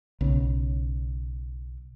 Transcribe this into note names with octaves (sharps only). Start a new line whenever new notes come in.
B1 C#3